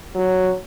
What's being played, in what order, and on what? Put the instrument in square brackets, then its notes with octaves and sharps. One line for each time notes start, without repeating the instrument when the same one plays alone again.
[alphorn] F#3